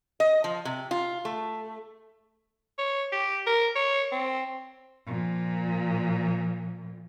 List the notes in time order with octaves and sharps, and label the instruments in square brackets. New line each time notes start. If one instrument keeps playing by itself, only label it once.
[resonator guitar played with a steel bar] D#5
F3
C3
F4
A3
[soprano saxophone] C#5
G4
A#4
C#5
C4
[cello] A#2 F3